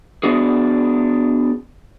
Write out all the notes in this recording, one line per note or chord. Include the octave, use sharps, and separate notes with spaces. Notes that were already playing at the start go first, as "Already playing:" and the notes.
B3 D4 F#4 G#4